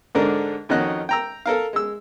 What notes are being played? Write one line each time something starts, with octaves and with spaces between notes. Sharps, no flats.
G#2 D3 D4 A#4
F2 D#3 C#4 F#4 D#5 F#6
G5 A#5 E6
A4 A#4 F5
G#3 E6